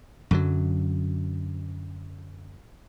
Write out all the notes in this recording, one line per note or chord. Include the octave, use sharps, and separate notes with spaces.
F#2 D3 F#3